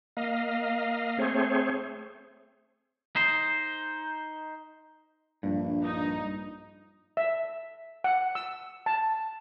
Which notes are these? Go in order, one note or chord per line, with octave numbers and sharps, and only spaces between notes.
A#3 D#5 F5
A3 C4 G#4 C5 C#5
D#4 C5
A#1 G2
D#4
E5
F#5
E6
A5